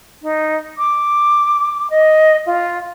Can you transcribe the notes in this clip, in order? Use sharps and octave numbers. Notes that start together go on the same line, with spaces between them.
D#4
D6
D#5
F4